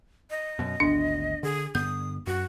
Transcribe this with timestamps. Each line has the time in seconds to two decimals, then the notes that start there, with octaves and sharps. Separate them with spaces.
0.31 D#5
0.59 F#2 B2
0.80 G#1 D2 B3 D4
1.43 D3 G#4
1.75 G2 D3 B3 D#6 G6
2.27 F#2 F#4